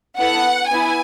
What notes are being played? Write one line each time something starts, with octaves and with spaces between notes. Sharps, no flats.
B3 E4 A4 F#5
B3 E4 G#5